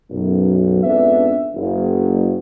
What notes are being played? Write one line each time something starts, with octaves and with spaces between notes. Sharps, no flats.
B1 F#2
F2 G#2 B3 D4 E5
F#1